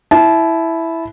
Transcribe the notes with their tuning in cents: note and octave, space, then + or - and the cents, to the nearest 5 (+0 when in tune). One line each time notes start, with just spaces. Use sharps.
E4 +0 A5 -30